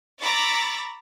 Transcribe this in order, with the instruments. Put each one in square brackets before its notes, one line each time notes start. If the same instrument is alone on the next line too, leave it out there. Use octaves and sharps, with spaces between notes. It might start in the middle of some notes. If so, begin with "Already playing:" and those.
[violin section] A#5 B5 C#6 D6 E6 A6